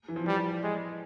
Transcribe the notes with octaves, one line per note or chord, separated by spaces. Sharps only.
E3
F3
E3 G3
G#3